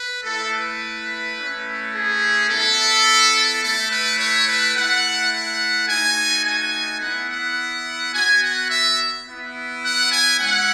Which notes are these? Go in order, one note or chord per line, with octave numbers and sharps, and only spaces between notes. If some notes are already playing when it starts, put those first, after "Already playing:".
Already playing: B4
A3 E4 A4
B4
A3 C#4 E4
G#4
B3 E4 A4
A3 E4 A4
B4
C#5
B4
A3 E4 F#5
F#5
A3 D#4 F#4 G#5
G#5
B3 E4 F#5
F#5
B3 F#4 G#5
F#5
E5
B3 E4
F#5
G#5
G#3 C#4 E4 F#5